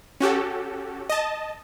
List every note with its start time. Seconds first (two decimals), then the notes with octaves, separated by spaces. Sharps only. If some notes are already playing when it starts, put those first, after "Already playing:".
0.20 C#4 F#4 G4 A4
1.09 D#5 A5